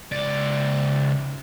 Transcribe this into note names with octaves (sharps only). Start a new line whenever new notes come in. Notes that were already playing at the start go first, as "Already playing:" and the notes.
C#2 D5